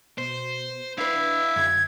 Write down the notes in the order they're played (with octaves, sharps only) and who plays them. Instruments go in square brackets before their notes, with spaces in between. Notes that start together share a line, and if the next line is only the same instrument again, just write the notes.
[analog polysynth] B2 [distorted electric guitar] C5
[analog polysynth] D4 B4 [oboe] E4 [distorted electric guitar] E5 F5
[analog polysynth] F#2 D3 [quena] G#6